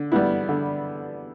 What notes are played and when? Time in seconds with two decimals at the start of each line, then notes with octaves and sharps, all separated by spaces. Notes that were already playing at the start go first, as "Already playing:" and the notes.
Already playing: D3
0.12 G3 B3 E4
0.49 D3